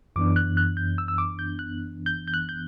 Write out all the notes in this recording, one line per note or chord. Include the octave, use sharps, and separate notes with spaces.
F#2 E3 B3 D4 D6
F#6
F#6
G6
E6
E6
D6
G6
F#6
G6
G6
F#6
G6